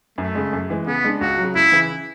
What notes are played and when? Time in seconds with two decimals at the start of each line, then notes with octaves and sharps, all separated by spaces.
0.18 F#2 A3
0.35 C#3 G#3
0.53 F#2
0.70 E3 G#3
0.87 C#3 B3
1.04 G#3 D4
1.21 C#2 F#4
1.38 F#3
1.43 C#3
1.55 C#2 E4
1.72 C#3 E3